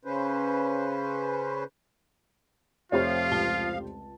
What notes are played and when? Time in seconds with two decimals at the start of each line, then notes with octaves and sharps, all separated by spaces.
0.05 C#3 C#4 B4 C5
2.92 F1 F3 F4 G4 C5 C#5 E5 F5
3.31 C#2 A5 G7